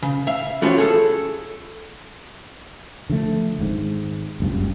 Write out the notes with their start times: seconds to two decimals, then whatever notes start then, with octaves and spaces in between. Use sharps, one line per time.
0.03 C#3
0.27 E5 F5
0.62 E3 F3 C#4 F#4 G4
0.78 G#4 A4
3.10 D3 F3 A3
3.59 G#1 G#2
4.40 F#1 C#2 G2